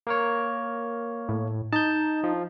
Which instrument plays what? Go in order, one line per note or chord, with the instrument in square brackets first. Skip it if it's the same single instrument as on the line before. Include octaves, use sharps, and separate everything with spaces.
[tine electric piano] A#3 A#4 C#5
[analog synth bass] A2
[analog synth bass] D#4 [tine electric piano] A5 G6
[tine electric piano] F3